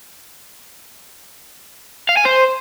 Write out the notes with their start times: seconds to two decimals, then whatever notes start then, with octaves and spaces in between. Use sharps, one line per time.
2.09 F5
2.17 G#5
2.25 C5